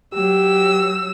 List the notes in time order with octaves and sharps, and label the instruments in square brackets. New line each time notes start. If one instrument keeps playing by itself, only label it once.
[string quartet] F#3 E6 [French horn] G4